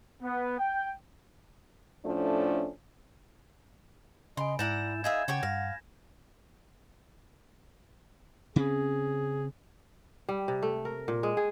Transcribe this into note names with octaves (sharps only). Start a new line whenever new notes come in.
B3
G5
A2 F3 A3 C#4 D4
C#3 D#5 G#5 B5 C6
G#2 E4 D5 F#5 A#5 G6 A6 E7
D#4 G#4 E5 F5 G#6
C#3 G4 C#5 F#5 G5
G2 F5 A#6
C#3 C4 C#4 G#4
G3
C3
A3
A#4
A#2
G#3
G#4